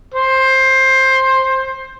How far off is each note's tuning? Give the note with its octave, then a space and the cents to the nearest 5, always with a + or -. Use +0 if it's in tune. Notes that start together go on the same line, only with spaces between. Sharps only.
C5 +15